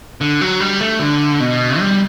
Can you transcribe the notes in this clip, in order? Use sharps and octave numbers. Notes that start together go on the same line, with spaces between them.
D3
F#3
G3
A3
D3
B2
G3